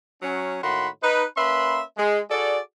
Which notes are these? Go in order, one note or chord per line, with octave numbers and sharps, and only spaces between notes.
F#3 C#4
A2 D#3 A#3 F#4 B5 C6
D#4 B4
A#3 C#4 B4 E5 B5 C6
G#3
F#4 G#4 A4 D5